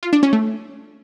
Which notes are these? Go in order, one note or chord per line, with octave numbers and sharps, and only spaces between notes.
F4
D4
C#4
A3